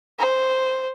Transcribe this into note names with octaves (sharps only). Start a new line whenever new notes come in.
C5